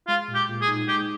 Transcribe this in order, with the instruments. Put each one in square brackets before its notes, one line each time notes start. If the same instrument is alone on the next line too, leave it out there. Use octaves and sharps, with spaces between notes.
[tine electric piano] G#3 [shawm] F4
[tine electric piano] A#2
[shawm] G4
[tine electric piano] A#2
[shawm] G#4
[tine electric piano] D#4
[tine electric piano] G#3 [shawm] G4